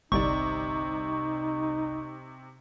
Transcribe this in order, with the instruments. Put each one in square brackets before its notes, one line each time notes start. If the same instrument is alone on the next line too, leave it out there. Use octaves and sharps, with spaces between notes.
[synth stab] G1 C2 D5 [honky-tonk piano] C3 [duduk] D#4 [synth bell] C#6